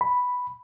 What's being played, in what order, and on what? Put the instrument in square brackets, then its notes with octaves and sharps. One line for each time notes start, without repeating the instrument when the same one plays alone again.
[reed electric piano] B5